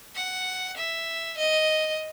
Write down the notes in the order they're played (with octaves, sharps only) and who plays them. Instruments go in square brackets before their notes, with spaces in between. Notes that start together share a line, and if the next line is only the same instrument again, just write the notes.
[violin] F#5
E5
D#5